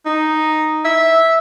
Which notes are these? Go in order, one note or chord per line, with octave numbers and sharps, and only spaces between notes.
D#4
E5